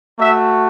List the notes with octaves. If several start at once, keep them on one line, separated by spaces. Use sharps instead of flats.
A3 F#4 E5